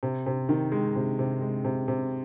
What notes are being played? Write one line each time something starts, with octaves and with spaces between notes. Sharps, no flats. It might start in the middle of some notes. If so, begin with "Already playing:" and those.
C3
C3
D#3
G#3
C3
C3
G#3
C3
C3